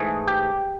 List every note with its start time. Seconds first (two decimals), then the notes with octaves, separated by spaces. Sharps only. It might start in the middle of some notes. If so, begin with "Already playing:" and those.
Already playing: G#2 E3 A3 G#4
0.27 G4